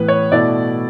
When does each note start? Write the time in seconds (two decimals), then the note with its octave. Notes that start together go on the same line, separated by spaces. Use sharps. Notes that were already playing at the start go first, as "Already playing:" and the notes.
Already playing: A2 E3 B3 B4
0.08 C#5
0.32 B2 A3 E4 D5